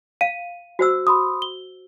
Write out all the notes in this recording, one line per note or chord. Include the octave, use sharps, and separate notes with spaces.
F5 D#7
F#4 C5 E6
B5 C6 D#6
G7